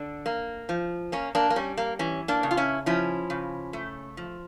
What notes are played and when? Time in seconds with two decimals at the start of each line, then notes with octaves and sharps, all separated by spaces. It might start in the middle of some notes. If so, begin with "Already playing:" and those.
Already playing: D3 D4
0.26 A#3
0.69 F3
1.12 A#3 C#4
1.35 A#3 D4
1.50 A#3
1.56 G3 C#4
1.77 A#3
1.99 E3 C#4
2.28 A#3 D4
2.43 C#3
2.51 F4
2.57 C#4 E4
2.86 F3 C#4 E4
3.30 C#3
3.73 A3
4.17 F3